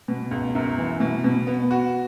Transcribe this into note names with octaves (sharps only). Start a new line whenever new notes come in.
B2
C#2
F#2
E3
B2
B2
B3
F#4